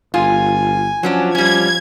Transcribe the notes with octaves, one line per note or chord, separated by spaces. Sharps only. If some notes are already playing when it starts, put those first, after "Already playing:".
G1 F4 G#5
F3 F#3 C#4 D4
G3 C#4 G#6